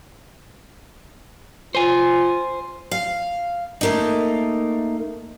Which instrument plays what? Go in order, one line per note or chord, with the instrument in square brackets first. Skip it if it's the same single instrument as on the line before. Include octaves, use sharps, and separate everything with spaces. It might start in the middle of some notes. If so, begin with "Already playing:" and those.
[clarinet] F4 [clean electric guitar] C5 G#5
[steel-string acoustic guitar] F5
A3 A#3 D#4